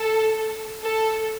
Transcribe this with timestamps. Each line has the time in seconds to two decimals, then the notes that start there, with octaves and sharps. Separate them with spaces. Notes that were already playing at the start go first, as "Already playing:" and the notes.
Already playing: A4
0.82 A4